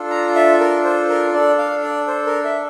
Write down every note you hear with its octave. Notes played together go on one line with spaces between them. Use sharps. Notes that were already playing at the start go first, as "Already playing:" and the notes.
Already playing: D4 F4 A4
A#5
E5
A#4
C5
A#4
D4 A4 D5
F5
D5
C5
A#4
E5